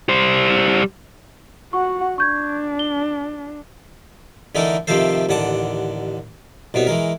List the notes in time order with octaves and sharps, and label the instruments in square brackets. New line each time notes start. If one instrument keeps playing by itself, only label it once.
[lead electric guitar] G3 C5
[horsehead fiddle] F#4 F#5 [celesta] C#6
[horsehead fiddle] D4 [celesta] C#6 G6 G#6
[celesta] G7
[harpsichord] D3 E3 A3 D#4 A4 A#4
C3 D#3 F3 A3 A4 C5
A1 D#2 D3 F#5 A5 D6
C2 B2 B3 C#5
E3 G#3 A#4